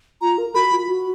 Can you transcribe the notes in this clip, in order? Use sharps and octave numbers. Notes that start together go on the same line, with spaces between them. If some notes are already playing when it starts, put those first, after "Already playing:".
F4 A#5
A#4
F#4 B5
F4
F#4